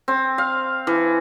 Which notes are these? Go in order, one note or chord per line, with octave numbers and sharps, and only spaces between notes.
C4
F5
E3